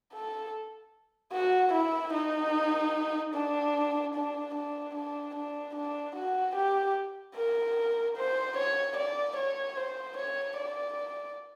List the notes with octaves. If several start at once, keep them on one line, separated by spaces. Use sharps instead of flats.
A4
F#4
E4
D#4
D4
D4
D4
D4
D4
D4
F#4
G4
A#4
C5
C#5
D5
C#5
C5
C#5
D5